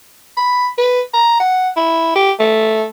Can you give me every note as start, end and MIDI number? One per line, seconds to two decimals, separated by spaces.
0.37 0.69 83
0.78 1.00 71
1.14 1.37 82
1.40 1.69 78
1.76 2.15 64
2.15 2.32 67
2.40 2.85 57